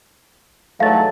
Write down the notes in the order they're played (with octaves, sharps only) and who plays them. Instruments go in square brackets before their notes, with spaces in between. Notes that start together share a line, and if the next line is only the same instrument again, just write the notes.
[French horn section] G#2 E3 F#3 [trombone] A3 [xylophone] F5 A6